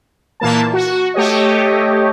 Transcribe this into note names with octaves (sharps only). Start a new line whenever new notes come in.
A#2 E3 A#3 A5
F#4
A3 G4 C#5 D#5